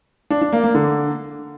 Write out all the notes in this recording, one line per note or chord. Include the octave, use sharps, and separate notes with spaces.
D4
D4
A#3
A#3
D3